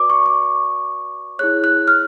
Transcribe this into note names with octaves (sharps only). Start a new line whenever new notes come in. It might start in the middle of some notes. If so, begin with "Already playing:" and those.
Already playing: F#4 B4 D5 D6
C#6
D6
E4 G#4 C#5 F#6
F#6
F6